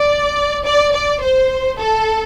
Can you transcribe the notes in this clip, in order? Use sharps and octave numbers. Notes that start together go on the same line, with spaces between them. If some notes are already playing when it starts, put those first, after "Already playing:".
Already playing: D5
D5
D5
C5
A4